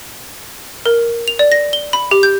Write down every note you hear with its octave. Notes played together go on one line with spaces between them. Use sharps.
A#4
F7
D5
A#6
G7
B5
G4
G6